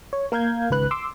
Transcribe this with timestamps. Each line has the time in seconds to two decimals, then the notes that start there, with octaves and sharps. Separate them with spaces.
0.13 C#5
0.32 A#3 A#4 F5 G6 G#6
0.70 G#1 C#2 G#2 B4 F#6
0.91 C6 D6 E6